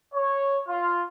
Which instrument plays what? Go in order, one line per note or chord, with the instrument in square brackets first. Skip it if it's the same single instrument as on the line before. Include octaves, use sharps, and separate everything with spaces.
[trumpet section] C#5
F4